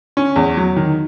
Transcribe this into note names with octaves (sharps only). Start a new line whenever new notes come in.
C#4
E2
F#3
D#3